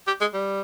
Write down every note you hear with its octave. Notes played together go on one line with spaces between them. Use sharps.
G4
G#3
G3